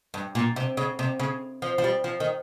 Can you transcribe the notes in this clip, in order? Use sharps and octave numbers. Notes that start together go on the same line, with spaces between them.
G2
A#2
C3
C#3
C3
C#3
F3
F3
G3
F3
D#3